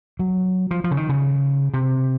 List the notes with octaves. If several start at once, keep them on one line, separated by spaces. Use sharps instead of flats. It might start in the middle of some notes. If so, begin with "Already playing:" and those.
F#3
F3
F3
C#3
D#3
C#3
C3